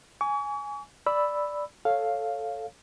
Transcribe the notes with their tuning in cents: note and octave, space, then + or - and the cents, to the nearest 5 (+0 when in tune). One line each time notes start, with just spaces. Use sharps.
G#5 +0 C#6 +40
D5 +0 B5 +0 E6 +0
A4 +0 C#5 +0 F5 +0